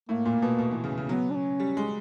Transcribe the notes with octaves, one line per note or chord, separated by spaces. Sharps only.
A2 A#3
A#2
B2
B2
E3
C#3
C#3
F#3 B3
D4
C#4
G3
G#3